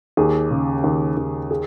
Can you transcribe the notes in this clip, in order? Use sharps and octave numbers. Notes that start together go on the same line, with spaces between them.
D#2 G#4
C#3
D#2
D#2
G#4